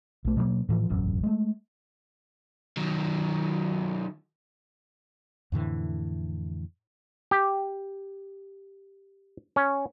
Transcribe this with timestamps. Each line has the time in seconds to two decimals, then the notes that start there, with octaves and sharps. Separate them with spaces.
0.25 B1 A3
0.36 B2 F#3 G3 A#3
0.69 A2 E3 F3
0.89 E1 A1 F#2
1.23 G#3 A3
2.77 D#3 F#3
5.52 F2 A2 D3 E3
7.31 G4
9.56 C#4